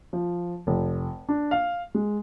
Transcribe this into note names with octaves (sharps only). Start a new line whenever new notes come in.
F3
F1
D4
F5
G#3